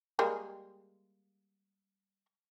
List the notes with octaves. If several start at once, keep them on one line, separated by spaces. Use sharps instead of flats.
G3 G#3 A#3